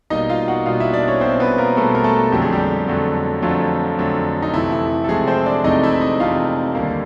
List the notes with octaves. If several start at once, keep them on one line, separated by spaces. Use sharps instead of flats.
B2 G3 A#3 D#4 D#5
F4 F5
F#4 F#5
B2 G3 A#3 F4 F5
E4 E5
D4 D5
C#4 C#5
B2 G3 A#3 C4 C5
B3 B4
A#3 A#4
B2 G3 A3 A#3 A4
A#4
A3 A4
F2 D3 F#3 A3 G4
G#4
G3 G4
F2 D3 F#3 A3
F2 D3 F3 F#3 A3 F4
F2 D3 F#3 A3
D#4
F2 C3 E3 A3 E4
E4
A4
F2 C3 E3 G#3 A3 G#4
C4 C5
D4 D5
F2 C3 E3 A3 D#4 D#5
E4 E5
D#4 D#5
F2 C3 E3 A3 F4 F5
D#2 D3 G3 A#3